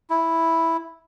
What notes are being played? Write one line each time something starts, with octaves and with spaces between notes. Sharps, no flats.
E4